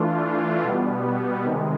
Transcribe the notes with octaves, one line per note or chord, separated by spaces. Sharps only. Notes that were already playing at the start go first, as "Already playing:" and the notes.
Already playing: E3 A3 D4 F4
B2 G3 B3
C3 D#3 G#3